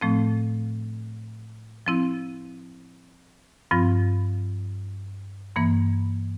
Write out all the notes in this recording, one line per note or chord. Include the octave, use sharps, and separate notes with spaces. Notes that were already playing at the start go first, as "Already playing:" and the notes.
A2 F3 A3 C4
F3 C4 E4
G2 F3 C4 F4
G2 E3 A#3